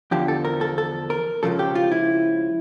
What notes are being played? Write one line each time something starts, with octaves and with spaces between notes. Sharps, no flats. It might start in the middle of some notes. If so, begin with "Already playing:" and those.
E2 D3 F3 G4
A4
A#4
A4
A4
A#4
C#2 C#3 F3 A4
G4
F4
E4